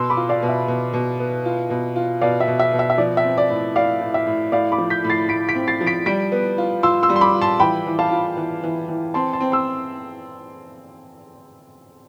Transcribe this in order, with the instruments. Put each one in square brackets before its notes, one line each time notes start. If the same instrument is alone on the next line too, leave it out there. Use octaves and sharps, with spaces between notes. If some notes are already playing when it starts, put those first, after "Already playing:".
Already playing: [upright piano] B2 [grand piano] C6 E6
[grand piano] B5 D6
[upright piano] F4
[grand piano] D5 F5
[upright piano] B2
[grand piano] E5
[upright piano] B2
B2
B3
F4
B2
F4
[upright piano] B2 [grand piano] D5 F5
[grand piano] E5
[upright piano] B2
[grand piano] E5
[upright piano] B2
[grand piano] E5
E5
[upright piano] F3 [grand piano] D5
[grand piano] E5
[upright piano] C4
[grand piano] D5
[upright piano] A2
[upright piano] A2 [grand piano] D5 F5
[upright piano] A2
[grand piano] E5
[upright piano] A2
[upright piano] A2 [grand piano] D5 F5
[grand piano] B5 D6
[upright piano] F3
[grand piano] G6 B6
[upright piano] A2
[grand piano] A6 C7
[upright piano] A2 [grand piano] B6 D7
[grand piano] B6 D7
[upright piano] C4
[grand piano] A6 C7
[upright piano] F3
[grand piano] B6 D7
[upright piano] G3 [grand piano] B6 D7
[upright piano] B3
F4
[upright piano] F4 [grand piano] C6 E6
[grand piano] C6 E6
[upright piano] G3
[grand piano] C6
B5 D6
[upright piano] F4
[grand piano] A5 C6
[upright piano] E3 [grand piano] G5 B5
[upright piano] E3
[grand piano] F5 A5
[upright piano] F4
E3
E3
E3
[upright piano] C4 [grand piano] A5 C6
[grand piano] A5 C6
[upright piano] C4
[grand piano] C6 E6